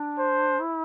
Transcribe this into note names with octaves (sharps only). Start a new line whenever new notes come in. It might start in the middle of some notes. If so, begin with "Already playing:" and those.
Already playing: D4
C5
E4